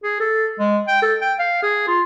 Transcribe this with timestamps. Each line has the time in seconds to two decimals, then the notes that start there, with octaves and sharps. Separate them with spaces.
0.03 G#4
0.20 A4
0.59 G#3
0.88 G5
1.02 A4
1.21 G5
1.39 F5
1.63 G#4
1.88 F4